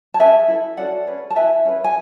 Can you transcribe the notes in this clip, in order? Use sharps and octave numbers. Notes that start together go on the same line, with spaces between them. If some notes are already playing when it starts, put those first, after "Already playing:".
A5
C#4 G#4 B4 E5 G#5
E4 A4
C#4 F#4 A4 D5 F#5
C#4 G#4 B4
A5
E4 B4 E5 G#5
C#4 G#4 B4
G#5